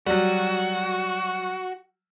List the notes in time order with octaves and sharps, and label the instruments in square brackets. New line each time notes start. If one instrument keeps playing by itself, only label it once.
[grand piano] F#3 G3 [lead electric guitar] F#4